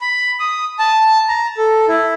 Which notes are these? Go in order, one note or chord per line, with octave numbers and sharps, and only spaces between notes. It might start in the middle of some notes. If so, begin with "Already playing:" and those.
B5
D#6
A5
A#5
A4
E4